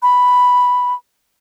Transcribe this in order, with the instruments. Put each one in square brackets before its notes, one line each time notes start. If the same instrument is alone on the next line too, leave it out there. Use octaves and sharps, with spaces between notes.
[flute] B5